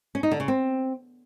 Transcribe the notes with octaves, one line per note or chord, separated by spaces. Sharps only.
C#4
D#4
D3
C#3
C4